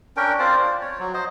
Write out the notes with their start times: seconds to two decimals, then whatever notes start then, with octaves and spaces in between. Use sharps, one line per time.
0.17 C#4 D4 A#4 G5
0.39 C4 F4 C5 D5
0.60 D5
0.81 C#5
0.99 F#3
1.14 C5 D#5